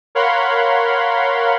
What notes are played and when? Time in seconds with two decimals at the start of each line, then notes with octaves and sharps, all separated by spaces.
0.15 A#4 C#5 F5 F#5 B5 C6